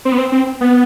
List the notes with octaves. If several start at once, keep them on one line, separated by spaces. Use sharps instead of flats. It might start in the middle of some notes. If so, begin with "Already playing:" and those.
C4
B3
C4
C4
B3